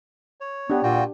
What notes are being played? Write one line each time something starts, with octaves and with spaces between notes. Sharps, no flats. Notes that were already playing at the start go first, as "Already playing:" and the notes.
C#5
B3 D4 G4
A#2 F4 F#4 G5